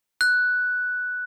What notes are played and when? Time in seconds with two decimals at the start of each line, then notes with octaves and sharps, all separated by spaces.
0.21 F#6